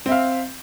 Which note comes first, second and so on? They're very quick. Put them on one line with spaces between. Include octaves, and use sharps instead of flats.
C4 E5 F5